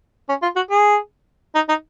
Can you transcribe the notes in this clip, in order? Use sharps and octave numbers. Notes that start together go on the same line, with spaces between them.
C#4
F4
F#4
G#4
D#4
D#4